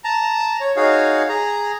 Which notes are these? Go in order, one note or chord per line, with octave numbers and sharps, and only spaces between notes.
A5 A#5
C#5
D#4 F#4 G#4 C#5 F5
G#4 A#5